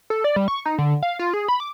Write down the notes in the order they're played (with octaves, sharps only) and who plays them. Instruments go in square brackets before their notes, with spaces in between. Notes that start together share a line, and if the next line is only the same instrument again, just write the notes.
[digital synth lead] A4
D5
G3
C#6
D#4
D3
F5
F4
G#4
B5
D6